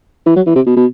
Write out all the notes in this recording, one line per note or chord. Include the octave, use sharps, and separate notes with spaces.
E3
F#3
E3
C3
B2
B2